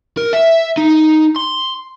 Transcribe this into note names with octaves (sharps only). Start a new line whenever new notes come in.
A#4
E5
D#4
C6